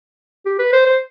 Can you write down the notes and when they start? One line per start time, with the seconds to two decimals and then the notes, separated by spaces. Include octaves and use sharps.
0.46 G4
0.59 B4
0.73 C5
0.86 C5